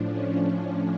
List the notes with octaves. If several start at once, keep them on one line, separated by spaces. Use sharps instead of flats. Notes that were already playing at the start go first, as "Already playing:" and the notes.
Already playing: A2 F3 D4
C#4